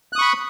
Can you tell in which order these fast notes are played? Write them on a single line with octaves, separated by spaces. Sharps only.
F#6 D#6 C#6 B5